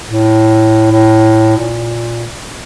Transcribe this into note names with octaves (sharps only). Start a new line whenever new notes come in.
A2
A2
A#2